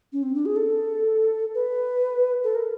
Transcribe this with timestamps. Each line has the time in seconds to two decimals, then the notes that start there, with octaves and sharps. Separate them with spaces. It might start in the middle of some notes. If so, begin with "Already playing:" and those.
0.13 C#4
0.23 C4
0.35 D4
0.46 G#4
0.56 A4
1.55 B4
2.44 A4
2.55 A#4